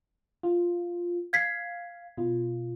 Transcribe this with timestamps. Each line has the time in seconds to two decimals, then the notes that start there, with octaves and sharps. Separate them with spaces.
0.43 F4
1.33 F5 G#6 B6 C7
2.17 B2 F4